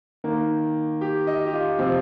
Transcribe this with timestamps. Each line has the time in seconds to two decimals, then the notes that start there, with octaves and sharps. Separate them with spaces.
0.24 D#3 A#3
1.01 G4
1.27 D#5
1.46 G4
1.53 F4
1.79 C3 F3 C4